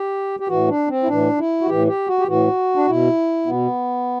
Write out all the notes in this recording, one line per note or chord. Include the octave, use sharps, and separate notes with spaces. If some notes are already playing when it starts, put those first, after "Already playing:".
Already playing: G4
G4
A2 E3 F#4
D4
C4
E4
A2 E3 D4
E4
F#4
A2 E3 G4
G4
F#4
G4
A2 E3 F#4
D4
B2 E4
B2 B3